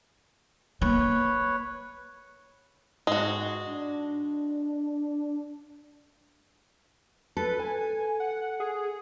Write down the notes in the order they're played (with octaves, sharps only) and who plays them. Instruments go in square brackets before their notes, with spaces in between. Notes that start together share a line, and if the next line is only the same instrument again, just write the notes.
[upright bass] A#3 [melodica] B4 C#5
[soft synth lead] G#2 [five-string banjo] G#3 F#4
[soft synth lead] D4
[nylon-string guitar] A4 [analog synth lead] B4
[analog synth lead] G#5
F#5
G#4